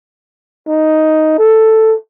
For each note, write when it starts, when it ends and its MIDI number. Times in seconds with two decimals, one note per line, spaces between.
0.68 1.36 63
1.39 1.94 69